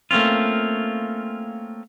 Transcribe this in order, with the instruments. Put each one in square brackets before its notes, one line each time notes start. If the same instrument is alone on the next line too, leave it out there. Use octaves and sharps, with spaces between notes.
[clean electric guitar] A3 A#3 C4 C#4 F4